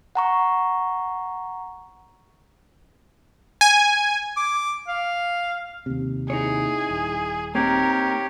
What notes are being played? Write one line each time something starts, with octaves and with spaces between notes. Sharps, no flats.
F#5 A#5 C#6
G#5
D6
F5
D#2 C3
D#4 E4 G#4 C#5
D#1
A#3 C4 D#4 G4 A#4 C#5